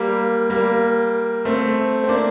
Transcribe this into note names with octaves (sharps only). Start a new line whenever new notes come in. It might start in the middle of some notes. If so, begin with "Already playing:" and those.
Already playing: G3 A#3
G3 A#3
A3 C4
C4
A#3 D4